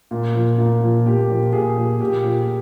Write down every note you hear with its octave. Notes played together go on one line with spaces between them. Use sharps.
A#2
F3
A#2
F3
A#2 G4
F3
A#2 G#4
F3
A#2 G4
F3